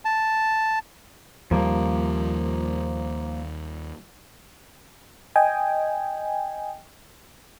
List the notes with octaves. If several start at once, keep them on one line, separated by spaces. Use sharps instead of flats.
A5
D#2 F3 G3 A#3
D#5 G5 G#5